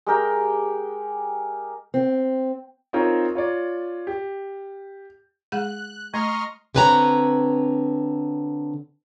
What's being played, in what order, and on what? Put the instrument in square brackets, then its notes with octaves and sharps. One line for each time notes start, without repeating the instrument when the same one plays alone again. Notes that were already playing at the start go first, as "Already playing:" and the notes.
[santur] G#3 G4 A#4 G5
[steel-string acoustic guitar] C4
[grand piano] C4 D#4 F4 A#4 C5 C#5
F4 C#5 D5
G4
[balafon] G#3 G#4 F#5 [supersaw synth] F#6
[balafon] A3 [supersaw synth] D#5 C6 F6 [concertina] A#5 C#6
[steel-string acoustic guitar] D3 C4 B4 C#5 A5 A#5